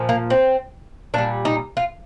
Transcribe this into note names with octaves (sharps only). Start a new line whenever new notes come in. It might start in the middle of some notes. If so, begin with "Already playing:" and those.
Already playing: A#2 F3
A#3
C4
A#2 G3 D4
D#4
F4